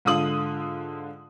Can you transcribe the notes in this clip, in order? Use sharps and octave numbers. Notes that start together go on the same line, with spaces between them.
G#2 D3 F4 F5 D#6 F#7